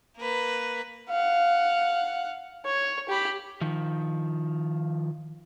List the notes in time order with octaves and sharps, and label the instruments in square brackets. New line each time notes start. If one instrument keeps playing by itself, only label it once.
[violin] A#3 B4
[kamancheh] F5 F#5
C#5
G4 B5
[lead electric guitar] D#3 F3